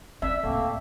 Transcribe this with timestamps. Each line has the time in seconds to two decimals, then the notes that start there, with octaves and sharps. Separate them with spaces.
0.22 C4 D5 E5
0.43 D1 A3 A#3 C4 F5